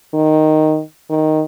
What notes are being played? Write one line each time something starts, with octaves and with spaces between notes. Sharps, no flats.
D#3
D#3